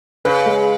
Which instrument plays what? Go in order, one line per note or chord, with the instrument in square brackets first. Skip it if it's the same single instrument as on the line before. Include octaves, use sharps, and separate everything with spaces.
[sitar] C#3 [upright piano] B4
[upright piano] G#3